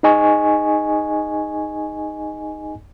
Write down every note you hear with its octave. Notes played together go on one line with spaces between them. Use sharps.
D#4 G#4 D#5 G#5 C#6